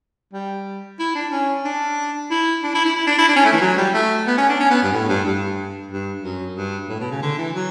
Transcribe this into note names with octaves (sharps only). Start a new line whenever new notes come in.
G3
E4
D4
C#4
D4
E4
D4
E4
E4
E4
D4
E4
D4
C#4
A3
E3
F#3
G3
A3
B3
C#4
D4
C#4
B3
G2
A2
G2
G2
G2
F#2
G2
A2
B2
C#3
D3
E3
F#3